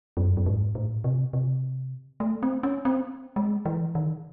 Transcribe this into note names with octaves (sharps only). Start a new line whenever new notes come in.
F#2
F#2
G#2
A2
C3
C3
A3
C4
C#4
C4
G#3
E3
D#3